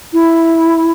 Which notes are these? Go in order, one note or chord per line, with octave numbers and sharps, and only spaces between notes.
E4